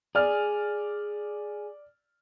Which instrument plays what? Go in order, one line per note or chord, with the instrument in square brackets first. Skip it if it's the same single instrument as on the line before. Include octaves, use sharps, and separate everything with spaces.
[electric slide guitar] G#4 [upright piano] D5 F6